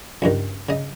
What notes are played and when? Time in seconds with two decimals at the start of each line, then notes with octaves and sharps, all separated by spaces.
0.22 C#2 G2 D#3
0.69 C#3 D#5